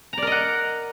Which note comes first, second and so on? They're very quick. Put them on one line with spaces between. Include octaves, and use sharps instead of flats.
A#5 D5 A#4 D#5 F#5